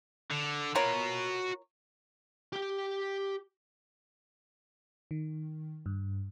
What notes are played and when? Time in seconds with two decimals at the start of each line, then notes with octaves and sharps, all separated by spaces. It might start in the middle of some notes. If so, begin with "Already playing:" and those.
0.31 D3
0.75 F4 F#4 A#4 C#5 B5
2.53 G4 G5
5.11 D#3
5.86 G2